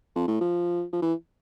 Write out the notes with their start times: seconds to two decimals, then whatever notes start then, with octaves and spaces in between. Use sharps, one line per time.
0.15 F2
0.28 A2
0.41 F3
0.93 F3
1.02 E3